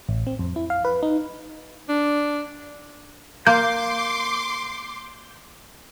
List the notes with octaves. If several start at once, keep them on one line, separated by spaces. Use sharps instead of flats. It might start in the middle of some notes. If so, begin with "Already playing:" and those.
A1
C4
F2
E4
F5
B4
D#4
D4
A#3 C6 D6 G6